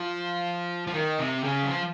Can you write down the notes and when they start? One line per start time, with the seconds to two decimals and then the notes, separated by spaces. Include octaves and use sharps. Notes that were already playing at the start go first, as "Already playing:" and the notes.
Already playing: F3
0.87 F3
0.94 D#3
1.18 C3
1.44 C#3
1.63 F#3
1.67 F3